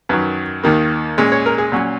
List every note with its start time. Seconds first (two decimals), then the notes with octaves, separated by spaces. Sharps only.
0.09 F#2 D#3 F#3 B4
0.63 D#2 D#3 A#3
1.18 A#2 G#3 C#4
1.32 C#5
1.46 A#4
1.58 G#4
1.72 A#2 F#3 C#4